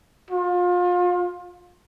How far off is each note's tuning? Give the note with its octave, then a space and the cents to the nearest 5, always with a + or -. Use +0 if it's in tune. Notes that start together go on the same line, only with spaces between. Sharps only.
F4 +30